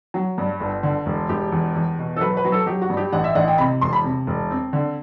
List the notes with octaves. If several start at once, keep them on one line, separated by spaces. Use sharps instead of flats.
F#3
G2
G1
D3
E1
E1 G4
E2
E2
B2
A4
F#3 B4
B4
F#3
A4
F#3 G4
F#4
G2
G4
A1 F#5
E5
A1 F#5
G5
C3 B5
E1 C6
B5
C3
E1
C4
D3